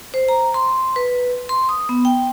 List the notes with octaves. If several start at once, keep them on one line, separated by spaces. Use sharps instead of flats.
C5
A#5
C6
B4
C6
D#6
B3
G5